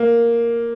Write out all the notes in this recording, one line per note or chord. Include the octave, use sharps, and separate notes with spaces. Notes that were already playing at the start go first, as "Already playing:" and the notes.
Already playing: A#3